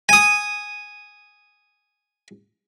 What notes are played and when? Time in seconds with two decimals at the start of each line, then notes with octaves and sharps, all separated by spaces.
0.09 G#5 D#6